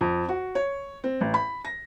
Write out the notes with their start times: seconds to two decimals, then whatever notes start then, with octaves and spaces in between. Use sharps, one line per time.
0.01 F2
0.29 F#4
0.55 C#5
1.04 C4
1.21 A1
1.34 B5
1.65 A#6